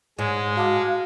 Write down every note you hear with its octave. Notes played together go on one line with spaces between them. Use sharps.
G#2 G#3 C#5
F#4 F5 A5 D6